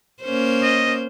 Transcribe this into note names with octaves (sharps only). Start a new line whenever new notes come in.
A#3 C#4 C5
D#5